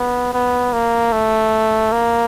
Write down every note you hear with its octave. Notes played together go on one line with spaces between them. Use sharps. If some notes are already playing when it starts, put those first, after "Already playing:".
Already playing: B3
B3
A#3
A3
A#3